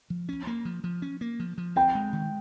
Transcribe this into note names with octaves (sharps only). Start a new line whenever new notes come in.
F3
C#4
A#3
F3
F3
C#4
A#3
F3
F3
C4 G5
G#3
D#3